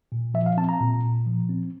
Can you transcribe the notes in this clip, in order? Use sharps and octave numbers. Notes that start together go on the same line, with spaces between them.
A#2
F3 E5
F5
C4 A5
A#5
A#2
A#2
F3
C4